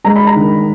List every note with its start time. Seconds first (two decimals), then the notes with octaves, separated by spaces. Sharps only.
0.05 G#3 A#5
0.16 B5
0.27 A#5
0.36 D#3